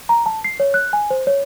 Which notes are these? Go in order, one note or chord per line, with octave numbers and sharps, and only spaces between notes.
A#5
A5
C7
C#5
F#6
G#5
C5
C#5